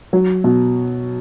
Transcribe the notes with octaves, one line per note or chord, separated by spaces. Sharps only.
F#3
B2